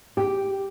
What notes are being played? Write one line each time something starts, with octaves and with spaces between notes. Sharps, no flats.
G4